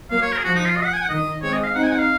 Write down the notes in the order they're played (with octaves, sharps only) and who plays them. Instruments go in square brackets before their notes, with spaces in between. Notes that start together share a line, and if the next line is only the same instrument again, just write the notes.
[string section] F#3 A#3 [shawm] F5
[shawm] C#5
A#4
G#4
[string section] F3 [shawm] F#4
[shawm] D#4
F4
D#5
F#5
G#5
F#5
[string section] D#3 [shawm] D#5
[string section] G#3 C4 [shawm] C#5
[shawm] D#5
F5
[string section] C4 D#4 [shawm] F#5
[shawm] G#5
F#5
F5